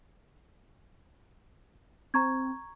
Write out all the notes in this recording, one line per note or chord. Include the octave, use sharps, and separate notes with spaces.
C4 A#5 C#6 G#6